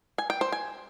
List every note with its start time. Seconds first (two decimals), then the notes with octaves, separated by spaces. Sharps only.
0.18 G#5
0.30 G5
0.41 C5
0.52 G#5